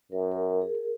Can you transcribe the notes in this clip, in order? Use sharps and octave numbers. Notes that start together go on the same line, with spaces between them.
F#2 A#4
A#4
G#4
A#4